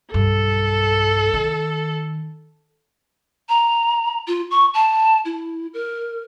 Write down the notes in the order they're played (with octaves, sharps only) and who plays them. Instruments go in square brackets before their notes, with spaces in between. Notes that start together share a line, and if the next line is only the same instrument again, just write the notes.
[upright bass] B1 G2 [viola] A4
[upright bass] D#3
[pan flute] A#5
F4
C#6
A5
E4
A#4